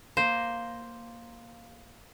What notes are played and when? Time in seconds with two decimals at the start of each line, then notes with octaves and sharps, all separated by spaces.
0.17 A#3 C5